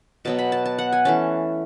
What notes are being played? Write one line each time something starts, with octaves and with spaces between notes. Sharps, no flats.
B2 F#3 B3 A5
B5
A5
A5
F#5
G#5
E3 A3 C#4 A5